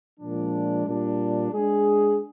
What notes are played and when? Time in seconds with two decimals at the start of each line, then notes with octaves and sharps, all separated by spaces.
0.20 A#2 F3 G#3 D4
0.87 A#2 G3 D4
1.52 G#3 D4 G#4